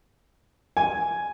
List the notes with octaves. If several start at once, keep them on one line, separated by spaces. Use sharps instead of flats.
G#5